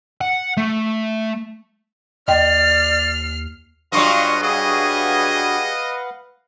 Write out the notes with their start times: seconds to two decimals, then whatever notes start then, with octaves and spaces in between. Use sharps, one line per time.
0.21 F#5
0.57 A3
2.28 D#2 D5 D#5 G5 F6 C7
3.92 G2 F#3 F4 D#5 C6 C#6
4.43 G3 G#4 B4 D#5 F5 F#5